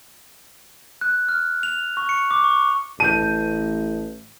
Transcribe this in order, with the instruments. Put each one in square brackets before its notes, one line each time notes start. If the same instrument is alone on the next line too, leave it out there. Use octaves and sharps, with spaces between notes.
[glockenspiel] F#6
F6
F7
C#6
C#7
D6
C#6
[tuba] A1 [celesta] A5 G6 [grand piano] D#7